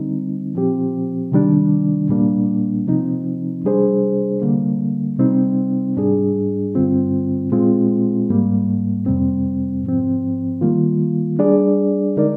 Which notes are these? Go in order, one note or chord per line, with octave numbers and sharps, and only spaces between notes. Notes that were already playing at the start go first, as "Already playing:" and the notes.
Already playing: D3 G3 C4 D#4
A#2 F3 C4 G4
C3 D#3 G3 D4
A#2 G3 A#3 D4
C3 F3 C4 D#4
C3 G3 D4 G#4 C5
D3 G3 A#3
C3 G3 C4 D#4
G#2 G3 D4 G#4
G2 D3 G3 C4 F4
A#2 G#3 C4 F4
G#2 G3 A#3
F2 C3 G3 C4
G#2 F3 C4
D#3 G3 A#3 F4
G3 D4 G#4 D5
D3 G#3 D#4 A#4 D5